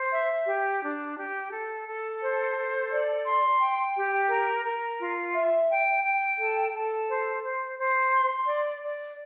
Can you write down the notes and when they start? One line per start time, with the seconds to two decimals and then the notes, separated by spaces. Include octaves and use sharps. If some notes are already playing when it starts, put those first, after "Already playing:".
Already playing: C5
0.12 E5
0.48 G4
0.82 D4
1.16 G4
1.51 A4
1.86 A4
2.22 C5
2.56 A4
2.91 D5
3.25 C6
3.60 G5
3.95 G4
4.30 A#4
4.65 A#4
4.99 F4
5.34 E5
5.69 G5
6.04 G5
6.38 A4
6.74 A4
7.08 C5
7.42 C5
7.78 C5
8.12 C6
8.47 D5
8.82 D5